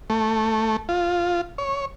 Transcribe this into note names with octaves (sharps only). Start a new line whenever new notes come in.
A3
F4
C#5